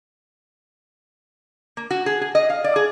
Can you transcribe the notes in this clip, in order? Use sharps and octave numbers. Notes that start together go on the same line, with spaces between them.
A#3
F#4
G#4
G#4
D#5
F5
D5
G#4